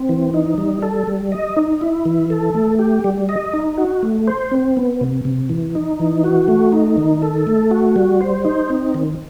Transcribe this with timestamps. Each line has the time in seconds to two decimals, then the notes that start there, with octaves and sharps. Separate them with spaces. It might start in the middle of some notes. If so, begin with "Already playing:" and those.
Already playing: C4
0.09 E3
0.34 D#4
0.58 G3
0.83 A4
1.07 G3
1.32 D#5
1.56 D#4
1.81 E4
2.05 E3
2.30 A4
2.54 A3
2.79 G4
3.04 G3
3.29 D#5
3.54 D#4
3.78 F#4
4.03 A3
4.27 C5
4.52 C4
4.77 B3
5.01 C3
5.25 C3
5.49 E3
5.75 D#4
6.00 E3
6.24 F#4
6.48 A3
6.72 D#4
6.97 D#3
7.22 A4
7.47 A3
7.71 F#4
7.96 G3
8.21 C5
8.45 D#4
8.70 C4
8.94 D#3